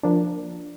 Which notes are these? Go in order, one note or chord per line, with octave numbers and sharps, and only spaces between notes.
F3 A#3 D4